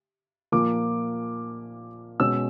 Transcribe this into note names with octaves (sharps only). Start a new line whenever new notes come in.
A#2 F3 A#3 D6
B2 G#3 C#4 E6